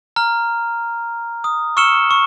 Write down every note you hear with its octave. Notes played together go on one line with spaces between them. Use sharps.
A#5 F6
D#6
C#6 E6 F6 C#7 E7 G7
C#6